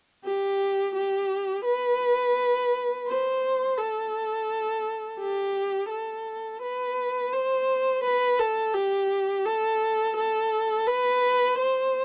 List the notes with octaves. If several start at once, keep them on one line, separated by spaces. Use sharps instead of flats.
G4
G4
B4
C5
A4
G4
A4
B4
C5
B4
A4
G4
A4
A4
B4
C5